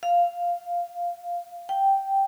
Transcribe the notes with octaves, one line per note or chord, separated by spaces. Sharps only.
F5
G5